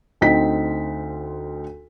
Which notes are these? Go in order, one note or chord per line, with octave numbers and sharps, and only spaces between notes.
D2 C4 D#4 B6